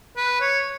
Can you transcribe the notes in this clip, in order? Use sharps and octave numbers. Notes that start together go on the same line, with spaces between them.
B4
C#5